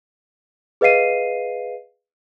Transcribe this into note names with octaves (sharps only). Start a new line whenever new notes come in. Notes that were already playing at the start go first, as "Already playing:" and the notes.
G#4 B4 D#5 F5 C7 D#7